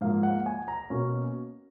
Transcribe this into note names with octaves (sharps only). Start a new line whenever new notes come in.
G#2 F3 A#3 F5
F#5
G#5
A#5
B2 A#3 C#4